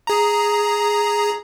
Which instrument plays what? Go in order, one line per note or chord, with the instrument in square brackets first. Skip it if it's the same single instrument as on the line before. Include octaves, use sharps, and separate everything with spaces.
[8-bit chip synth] G#4 A#5